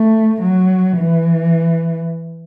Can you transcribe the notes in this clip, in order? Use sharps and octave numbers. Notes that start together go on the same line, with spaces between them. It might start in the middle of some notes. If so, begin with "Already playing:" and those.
Already playing: A3
F#3
E3